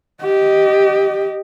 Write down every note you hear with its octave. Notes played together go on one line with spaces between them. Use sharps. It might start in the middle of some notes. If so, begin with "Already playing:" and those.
G4 D#5